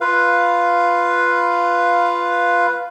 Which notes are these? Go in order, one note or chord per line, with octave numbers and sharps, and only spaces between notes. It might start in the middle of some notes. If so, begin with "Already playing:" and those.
F4 B4 F5